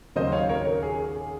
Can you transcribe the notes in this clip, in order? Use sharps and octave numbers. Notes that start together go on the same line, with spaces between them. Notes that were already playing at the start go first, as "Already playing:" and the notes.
D#2 C#3 F#3 A#3 C5 D#5
C#5 F5
A#4 C#5
A#4 C#5
G#4
G#4
G#4